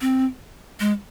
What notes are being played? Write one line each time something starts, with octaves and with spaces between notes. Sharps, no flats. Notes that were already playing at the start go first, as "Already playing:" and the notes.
C4
G#3